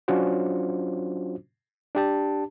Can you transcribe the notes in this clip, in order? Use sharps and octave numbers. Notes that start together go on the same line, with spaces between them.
F#3 C#4 D4 F4 F#4 C5
D4 G4 A5